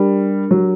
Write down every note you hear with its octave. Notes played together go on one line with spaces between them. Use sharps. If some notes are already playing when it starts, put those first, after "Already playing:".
Already playing: G3 D4 G4 A#4
F#3